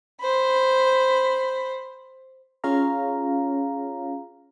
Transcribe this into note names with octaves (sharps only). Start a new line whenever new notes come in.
C5 B5
C#4 F4 G#4 C#5 F5 A#5